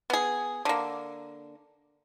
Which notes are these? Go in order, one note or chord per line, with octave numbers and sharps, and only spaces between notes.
B3 G#4
D3 A#3